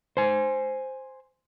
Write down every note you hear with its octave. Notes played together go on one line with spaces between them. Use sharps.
C5 G#5